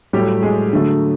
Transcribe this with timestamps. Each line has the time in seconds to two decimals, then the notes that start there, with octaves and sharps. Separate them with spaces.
0.13 A2 F#3 G3 A3 G4
0.42 G#3 G#4
0.73 D3 F#3 A3